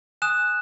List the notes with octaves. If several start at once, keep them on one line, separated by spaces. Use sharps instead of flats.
G#5 D#6 F#6 E7